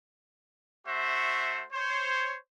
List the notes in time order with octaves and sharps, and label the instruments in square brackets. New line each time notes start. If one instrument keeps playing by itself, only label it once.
[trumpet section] A3 F#4 C5 E5
C5 C#5